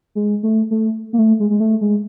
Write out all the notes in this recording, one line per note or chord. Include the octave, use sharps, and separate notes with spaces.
G#3
A3
A3
A#3
A3
G#3
G#3
A3
G#3